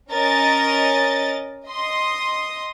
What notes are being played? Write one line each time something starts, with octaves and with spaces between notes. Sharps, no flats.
C#4 A#4 D#5 A6
D#5 C6 D#6